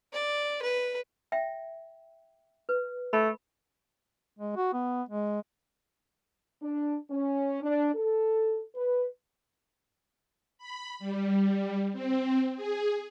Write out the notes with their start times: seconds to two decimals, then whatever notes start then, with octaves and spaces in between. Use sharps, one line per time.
0.13 D5
0.62 B4
1.32 E5 G5
2.69 B4
3.13 A3 B5
4.39 G#3
4.56 F#4
4.73 B3
5.09 G#3
6.62 D4
7.10 C#4
7.63 D4
7.95 A4
8.75 B4
10.58 B5
10.99 G3
11.93 C4
12.56 G#4